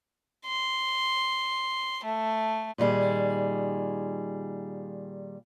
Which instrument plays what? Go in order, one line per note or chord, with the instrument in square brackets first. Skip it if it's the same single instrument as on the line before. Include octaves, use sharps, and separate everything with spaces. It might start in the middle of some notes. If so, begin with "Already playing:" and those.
[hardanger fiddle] C6
A3
[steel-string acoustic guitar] A#2 D#3 G3 G#4